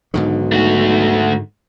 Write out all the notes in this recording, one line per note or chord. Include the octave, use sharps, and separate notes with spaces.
B1 G#2 D3 D#3
A3 F#4